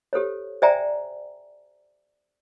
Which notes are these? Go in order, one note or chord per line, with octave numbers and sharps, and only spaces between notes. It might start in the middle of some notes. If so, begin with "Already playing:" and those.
G4 A4 C5 C#5
C5 D5 E5 G5 G#5 A#5